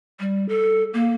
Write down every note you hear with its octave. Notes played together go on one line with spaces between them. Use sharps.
G3
A4
A#3